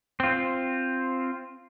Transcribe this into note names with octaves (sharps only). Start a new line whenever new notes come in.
C4 F4